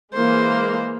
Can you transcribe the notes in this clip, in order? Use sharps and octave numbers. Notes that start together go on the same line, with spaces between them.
E3 G#3 A#3 C5